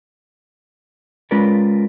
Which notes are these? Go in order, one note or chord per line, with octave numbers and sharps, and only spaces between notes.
G#3 C#4 F4 A#4 B4 D5